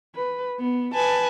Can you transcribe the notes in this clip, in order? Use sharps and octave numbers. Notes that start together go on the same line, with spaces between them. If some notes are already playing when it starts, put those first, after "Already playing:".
B4
B3
B4 G#5 A5